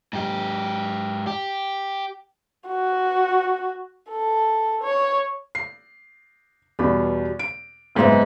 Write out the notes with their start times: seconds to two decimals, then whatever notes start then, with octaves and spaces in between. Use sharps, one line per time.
0.13 G#2 G4
1.27 G4
2.68 F#4
4.10 A4
4.83 C#5
5.55 C7
6.79 E2 B2 G3 B5
7.39 D7
7.95 F#1 G#2 G#3 B3 C5 E5